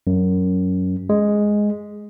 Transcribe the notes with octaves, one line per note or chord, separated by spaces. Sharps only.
F#2
G#3